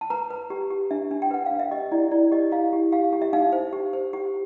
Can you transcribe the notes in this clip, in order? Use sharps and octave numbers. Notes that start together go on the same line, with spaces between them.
A5
B4 A#5
B4
G4
G4
D4 E5
D4
G5
B4 F#5
F5
D4
E5
G4 D#5
E4 D5
E4 D5
G4 D#5
E4 F5
G4
G4 F5
G4
E5
D#4 F5
C5
G4
C5
G4